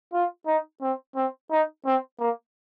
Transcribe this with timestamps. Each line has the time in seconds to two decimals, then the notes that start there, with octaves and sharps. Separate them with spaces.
0.13 F4
0.47 D#4
0.82 C4
1.16 C4
1.51 D#4
1.86 C4
2.19 A#3